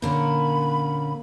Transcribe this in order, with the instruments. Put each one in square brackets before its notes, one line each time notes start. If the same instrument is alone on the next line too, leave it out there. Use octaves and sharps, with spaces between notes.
[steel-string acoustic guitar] A#2 D3 C#4 [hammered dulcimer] A#3 [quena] B5